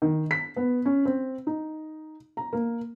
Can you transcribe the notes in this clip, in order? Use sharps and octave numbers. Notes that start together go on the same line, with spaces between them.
D#3
B6
B3
C#4
C4
D#4
A#5
A#3